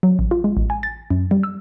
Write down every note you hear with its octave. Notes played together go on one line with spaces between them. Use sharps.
F#3
A1
F4
G#3
A1
G#5
A6
F#2
G3
E6